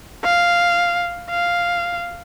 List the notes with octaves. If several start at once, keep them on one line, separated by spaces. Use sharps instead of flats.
F5
F5